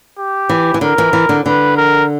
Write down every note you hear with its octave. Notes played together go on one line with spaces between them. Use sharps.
G4
E3
E3
D3 A#4
E3
E3
D3
D3 B4
A#4